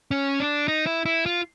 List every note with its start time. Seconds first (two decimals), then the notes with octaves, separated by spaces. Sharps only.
0.11 C#4
0.40 D4
0.68 D#4
0.86 E4
1.06 E4
1.26 F4